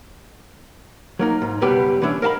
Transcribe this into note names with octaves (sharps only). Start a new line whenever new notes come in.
F#3 A#3 D#4
G#2
C#2 F#2 B2 G3 G4 B4
E3 C#4 D4 E5
A#4 D#5 F5 A5 B5